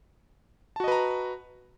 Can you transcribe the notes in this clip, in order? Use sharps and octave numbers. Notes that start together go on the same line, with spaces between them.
F#4 B4 D#5 A5 A#5